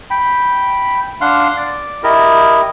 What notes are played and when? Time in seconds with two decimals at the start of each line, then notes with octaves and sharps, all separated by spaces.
0.10 G5 B5
1.21 D4 F5 F#5 C6
1.57 D5
2.03 E4 G4 A#4 D#5